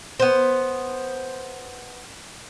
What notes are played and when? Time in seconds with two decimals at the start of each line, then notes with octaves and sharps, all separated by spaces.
0.20 B3 C5